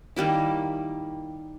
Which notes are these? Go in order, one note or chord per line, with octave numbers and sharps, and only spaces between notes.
D#3 G3 A#3 E4